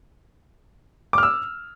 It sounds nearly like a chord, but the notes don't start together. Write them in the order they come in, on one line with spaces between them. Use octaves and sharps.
D6 F6 E6